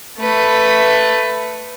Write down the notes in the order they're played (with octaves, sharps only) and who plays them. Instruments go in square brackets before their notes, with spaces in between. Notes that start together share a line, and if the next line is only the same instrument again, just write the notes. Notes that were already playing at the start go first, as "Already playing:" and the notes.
[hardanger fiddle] A3 B4